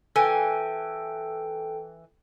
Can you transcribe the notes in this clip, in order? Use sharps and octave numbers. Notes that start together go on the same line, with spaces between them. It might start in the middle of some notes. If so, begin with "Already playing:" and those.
E3 A4 G5 G#5